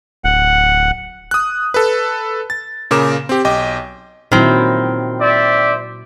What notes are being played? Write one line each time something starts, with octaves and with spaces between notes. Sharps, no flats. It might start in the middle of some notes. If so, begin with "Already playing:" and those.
D1 F#5
D#6 F#6
A4 B4
A6
A#2 C#3 A#4 D6 E7
C4 G4
B1 D#5 G5 D6
A#2 D#3 F#3 C4 E4
C5 D5 E5